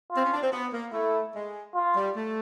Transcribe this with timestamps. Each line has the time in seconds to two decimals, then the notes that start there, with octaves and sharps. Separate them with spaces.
0.12 F4
0.17 C4
0.25 C#4
0.33 D4
0.43 C4
0.52 B3
0.73 A#3
0.93 A3 E4
1.35 G#3
1.75 F4
1.96 G3
2.16 A3